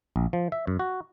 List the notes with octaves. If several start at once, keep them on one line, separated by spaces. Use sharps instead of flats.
A#1
F3
E5
F#2
F#4